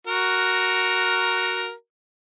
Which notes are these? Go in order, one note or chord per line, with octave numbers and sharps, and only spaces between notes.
F#4 A#4